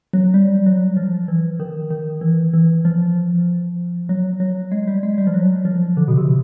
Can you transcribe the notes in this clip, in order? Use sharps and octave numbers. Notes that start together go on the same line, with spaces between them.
F#3
G3
F#3
F3
E3
D#3
D#3
E3
E3
F3
F#3
F#3
G#3
G3
G#3
G3
F3
F#3
F3
D3
B2
C3